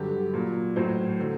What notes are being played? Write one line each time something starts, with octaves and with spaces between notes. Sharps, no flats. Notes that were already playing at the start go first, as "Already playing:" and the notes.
Already playing: G2 D3 F#3 G4
A#2 F#3
A2 F#3 C5
D3 F#3